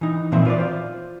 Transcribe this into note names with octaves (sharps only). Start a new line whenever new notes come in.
E3 D#4
A#2 E3 F3 C4 E5
F4 B4 C5 D5
F4 C5